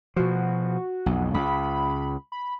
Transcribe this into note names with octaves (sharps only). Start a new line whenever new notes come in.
B2 F3 F#4
B1 F2
C#2 B5
B5